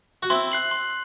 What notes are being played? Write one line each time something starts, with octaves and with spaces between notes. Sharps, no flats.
F#4
C4 E4 C6
F#6 C7 F#7
C6